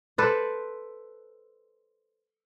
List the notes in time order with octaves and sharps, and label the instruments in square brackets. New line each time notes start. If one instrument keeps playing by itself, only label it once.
[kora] A4 B4 C5 D5